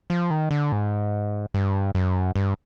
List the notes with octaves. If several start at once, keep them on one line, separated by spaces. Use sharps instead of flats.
F3
D#3
D3
G#2
G2
F#2
G2